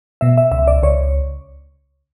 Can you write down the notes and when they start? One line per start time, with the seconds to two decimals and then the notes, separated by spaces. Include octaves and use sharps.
0.21 B2 E5
0.38 E5
0.52 C#2 E5
0.67 D5
0.83 C#2 C#5